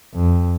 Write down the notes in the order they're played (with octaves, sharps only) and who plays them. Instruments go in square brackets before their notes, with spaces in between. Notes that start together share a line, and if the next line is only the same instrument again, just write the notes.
[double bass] F2